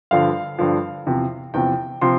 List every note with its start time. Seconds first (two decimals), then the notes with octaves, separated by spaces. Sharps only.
0.11 G2 D3 F3 F5
0.59 G2 D3 F3
1.07 E2 C3 F3
1.54 E2 C3 F3 G5
2.01 C3 F3 C6